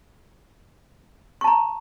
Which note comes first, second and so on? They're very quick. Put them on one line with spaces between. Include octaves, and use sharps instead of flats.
C#6 A5 A#5